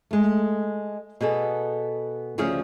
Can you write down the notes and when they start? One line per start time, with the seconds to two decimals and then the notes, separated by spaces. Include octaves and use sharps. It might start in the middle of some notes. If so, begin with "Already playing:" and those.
0.11 G#3 A3
1.21 B2 B3 G#4 A4
2.38 D2 C#3 F3 C#4 G#4 F5